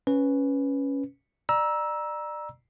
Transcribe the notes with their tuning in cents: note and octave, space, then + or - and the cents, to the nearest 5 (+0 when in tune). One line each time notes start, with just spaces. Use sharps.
C#4 +0 B4 +0
D5 +30 A#5 +25 E6 -5